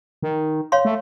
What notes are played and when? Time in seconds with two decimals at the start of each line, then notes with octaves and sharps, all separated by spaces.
0.22 D#3
0.72 C#5 F5 C6
0.85 A3